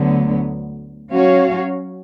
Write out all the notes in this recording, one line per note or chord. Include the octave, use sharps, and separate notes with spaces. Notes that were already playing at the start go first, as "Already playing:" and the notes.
Already playing: D2 D3 F#3 B3
F#3 C#4 F#4 C#5 F5